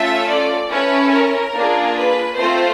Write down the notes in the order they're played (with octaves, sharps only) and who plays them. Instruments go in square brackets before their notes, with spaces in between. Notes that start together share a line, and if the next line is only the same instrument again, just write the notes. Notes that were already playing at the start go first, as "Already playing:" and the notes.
Already playing: [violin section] A3 C#4 F4 A4 E5
D5
C#4 E4 A4 B4
A#4
A#3 D4 F4 G#4
B4
A3 C4 F4 A4 C5